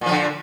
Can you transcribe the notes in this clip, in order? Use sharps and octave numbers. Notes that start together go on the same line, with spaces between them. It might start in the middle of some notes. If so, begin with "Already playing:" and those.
A#2 D3 F3